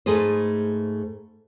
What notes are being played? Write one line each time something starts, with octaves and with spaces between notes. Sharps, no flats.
G#2 A3 G#4 B4 C5